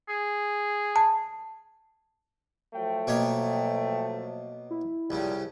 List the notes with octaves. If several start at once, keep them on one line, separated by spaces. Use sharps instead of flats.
G#4
A5
F3 F#3 A3 G5
B2 A#3 C#5
E4
C2 A#2 C#3 F3 G3